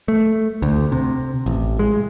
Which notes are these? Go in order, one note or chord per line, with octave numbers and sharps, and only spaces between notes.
A3
D2
C3
A1
G#3